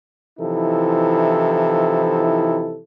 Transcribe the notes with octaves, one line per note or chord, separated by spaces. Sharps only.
C3 E3 F3 D#4 E4 A4